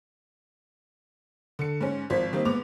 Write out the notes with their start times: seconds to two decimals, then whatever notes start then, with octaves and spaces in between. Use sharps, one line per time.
1.59 D3 C#7
1.81 G#2 C#4
2.10 G#1 F3 C5 B6
2.33 D#3 G3 A#3 C4 D#4
2.45 G#2 B3 D6 F7